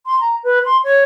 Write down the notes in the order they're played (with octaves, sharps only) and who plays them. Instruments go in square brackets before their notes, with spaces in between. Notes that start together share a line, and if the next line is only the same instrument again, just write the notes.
[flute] C6
A#5
B4
C6
C#5